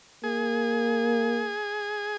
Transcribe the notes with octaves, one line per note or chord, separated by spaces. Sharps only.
A#3 G#4